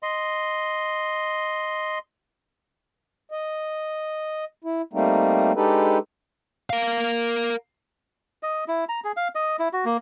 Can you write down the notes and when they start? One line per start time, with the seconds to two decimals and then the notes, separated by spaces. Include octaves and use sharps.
0.03 D#5 C6
3.31 D#5
4.64 E4
4.93 G3 A3 A#3 C4 D#4
5.56 G#3 D4 D#4 G4 A4 B4
6.70 A#4 F5
8.43 D#5
8.68 E4
8.89 A#5
9.04 G#4
9.17 F5
9.35 D#5
9.59 E4
9.73 F#4
9.85 A#3